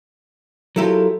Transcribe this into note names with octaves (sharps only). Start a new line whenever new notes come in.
F#3 E4 F4 G4 A4 A#4